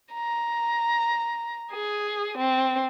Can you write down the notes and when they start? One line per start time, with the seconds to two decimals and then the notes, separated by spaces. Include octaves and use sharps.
0.13 A#5
1.72 G#4
2.38 C4